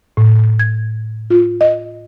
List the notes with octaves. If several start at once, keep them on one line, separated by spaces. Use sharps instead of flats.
A2
G#6
F4
D#5